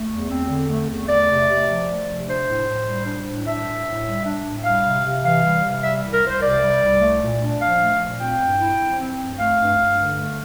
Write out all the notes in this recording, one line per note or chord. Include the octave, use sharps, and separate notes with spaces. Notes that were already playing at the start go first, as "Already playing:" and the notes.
Already playing: A3
E2
C4
D3
A3
E2
A3 D5
C3
C3
F3
A3
C3
D4 C5
A2
A2
G3
D4
A2
D4 E5
A2
A2
G3
D4
A2
G3 F5
C3
C3
E3 F5
G3
C3
G3 E5
C2
A#4
C2
C5
C3 D5
G3
C2
A3
A#2
D4
F3 F5
A3
A#2
C4 G5
G2
E4
F3
C4
G2
A3 F5
G2
G2
D3
A3